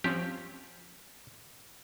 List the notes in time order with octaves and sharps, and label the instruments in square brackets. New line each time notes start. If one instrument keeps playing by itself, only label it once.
[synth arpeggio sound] F3 C4 C#4 [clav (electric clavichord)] G4